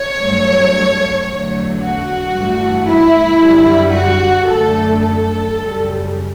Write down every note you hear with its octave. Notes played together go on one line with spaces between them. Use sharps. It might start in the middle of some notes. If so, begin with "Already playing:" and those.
Already playing: C#5
G2 F#3 A3
E2 D3 F#3 A3
F#4
G2 E3 A3
E4
F#2 D3 G3
F#4
F#2 D3 A3 A4
A4
F#2 C#3 G3